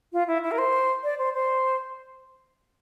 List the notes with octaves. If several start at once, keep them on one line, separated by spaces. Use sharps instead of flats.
F4
E4
E4
A#4
C5
D5
C5
C5